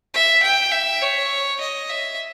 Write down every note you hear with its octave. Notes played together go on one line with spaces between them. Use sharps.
E5
G5
E5
C#5
D#5
E5